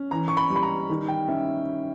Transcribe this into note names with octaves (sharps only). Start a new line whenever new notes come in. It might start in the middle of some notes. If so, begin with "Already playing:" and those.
Already playing: C#4
E3 A#5
C#6
B5
G3
B5
A#5
D#3
G5
C#4 E5